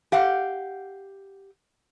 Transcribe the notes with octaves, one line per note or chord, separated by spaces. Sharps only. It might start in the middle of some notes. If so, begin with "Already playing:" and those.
G4 F5 F#5